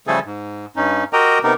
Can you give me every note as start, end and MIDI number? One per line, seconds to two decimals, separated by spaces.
0.07 0.19 49
0.07 0.19 53
0.07 0.19 55
0.07 0.19 57
0.07 0.19 68
0.07 0.19 69
0.26 0.66 44
0.76 1.04 43
0.76 1.04 61
0.76 1.04 63
1.13 1.39 66
1.13 1.39 67
1.13 1.39 70
1.13 1.39 75
1.13 1.39 79
1.13 1.39 82
1.43 1.54 48
1.43 1.54 59
1.43 1.54 63
1.43 1.54 67
1.43 1.54 70